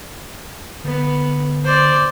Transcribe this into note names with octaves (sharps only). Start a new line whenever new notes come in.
D3 B3
C5 D5